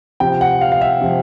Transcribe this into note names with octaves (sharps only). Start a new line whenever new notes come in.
C3 F3 G5
F#5
F5
F5
E5
C3 F3